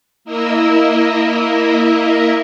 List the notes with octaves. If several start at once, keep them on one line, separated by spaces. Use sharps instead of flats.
A#3 E4 A#4 D#5 E5